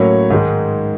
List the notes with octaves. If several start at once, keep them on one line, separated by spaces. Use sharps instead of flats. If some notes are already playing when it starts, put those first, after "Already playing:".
Already playing: A2 F#3 A#3 C#4 C#5
G#2 D#3 G#3